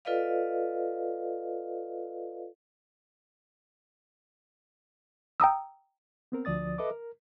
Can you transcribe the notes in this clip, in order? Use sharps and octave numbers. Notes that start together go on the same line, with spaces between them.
F4 A4 B4 D5 D#5 F5
G5 A#5 D#6 E6
B3 C4 A#4
D2 F3 D5 D#6 A6
A4 B4 D#5 E5 D6
A#4